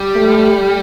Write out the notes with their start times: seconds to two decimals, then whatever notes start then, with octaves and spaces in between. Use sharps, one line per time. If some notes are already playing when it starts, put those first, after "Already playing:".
Already playing: G3
0.15 A3